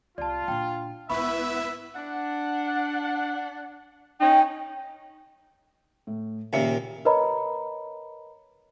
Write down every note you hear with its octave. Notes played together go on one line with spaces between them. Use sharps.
C2 F4 D5 A5
A#2 D4 G5
B1 G#2 B3 E4 B4 E5 B5 C#6
D4 F#5
C#4 D#4 G5
A2
D#2 A#2 C#3 A#3 E5 C#7
A#4 B4 C#5 D#5 A#5 B5